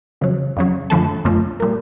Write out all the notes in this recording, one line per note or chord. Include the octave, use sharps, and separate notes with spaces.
F2 C#3 F#3
F2 C#3 F#3
F#2 D3 F3 A3 A4
F#2 D3 F3 A3
A#2 G3 A#3